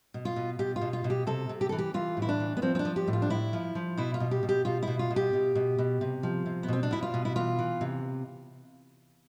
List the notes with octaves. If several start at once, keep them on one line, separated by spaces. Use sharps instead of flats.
B2
F4
B2
B2 G4
F4
B2
F4
B2
G4
C3 A4
C3
G4
E3 A4
G4
E3 F4
A2
E4
D4
E3
B3
F3 C4
C4
D4
F3
G4
A2
F4
D4
A2 E4
F3
F3
B2 E4
F4
B2
G4
B2
G4
B2 F4
B2 E4
F4
B2
G4
B2
B2
B2
C3
F3
C3
B3
B2 C4
D4
B2 E4
F4
B2
E4
E3 F4
E3
C3